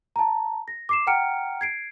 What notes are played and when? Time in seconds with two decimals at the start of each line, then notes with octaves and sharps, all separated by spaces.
0.16 A5 A#5
0.68 A#6
0.89 D6 C7 E7
1.07 F#5 G5 A#5 F6 C#7 D7
1.61 G#6 C7 D7